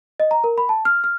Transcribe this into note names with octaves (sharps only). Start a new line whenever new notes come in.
D#5
A#5
A#4
B5
A5
F6
F6